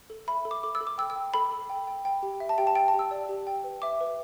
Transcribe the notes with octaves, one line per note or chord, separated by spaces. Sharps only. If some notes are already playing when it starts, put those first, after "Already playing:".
A4
E5 B5
A4
D6
A4 D6
E6
A4
D6
G5 E6
E6
G5
A4 B5
A4
G5
G5
G5
G4
E5
A5
G4 G5
A5
G5
A5
G4
E6
D5
G4
G5
B4
E5 D6
B4